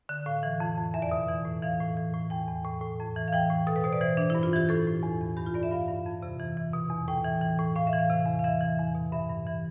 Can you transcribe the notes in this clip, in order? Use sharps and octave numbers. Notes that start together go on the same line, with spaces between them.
D3
A2 F5
E3
F2
F2
E2 E5
D5
B2 E5
E3
A2
E3 F5
A2
E3
A2
E2 G5
E2
A2
A2
F2
E3
F5
E3 G5
A2
B2 A4
B4
B2 C5
D5
E3 C5
E3 D4
G2 E4
F4
E3 G4
A2 A4
A2
E2
E2
G2 G4
F4
G2 D5
E5
G2 F5
G2
F2
C3
E3
E3
B2
E2
A2 G5
E3
E3
A2
A2 F5
E5
E3
F5
C3
E2
F5
E3 E5
E3
E2
B2
G2 E5
G2
E3